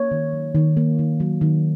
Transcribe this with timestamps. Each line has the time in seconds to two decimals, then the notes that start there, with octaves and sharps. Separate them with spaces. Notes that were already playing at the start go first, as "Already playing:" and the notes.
Already playing: A#3 C#5
0.11 D#3
0.33 F#3
0.55 D#3
0.77 A#3
0.99 D#3
1.20 F#3
1.41 D#3